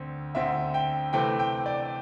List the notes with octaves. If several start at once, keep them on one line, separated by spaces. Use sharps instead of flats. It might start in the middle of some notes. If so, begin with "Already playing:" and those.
Already playing: D2 D3 C4
D2 D3 C4 E5
G5
C3 E3 A3 C4 G5
G5
D5